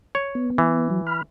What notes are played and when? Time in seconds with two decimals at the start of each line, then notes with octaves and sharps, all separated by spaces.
0.15 C#5
0.35 B3
0.58 E3
0.90 F#3
1.07 B5 F6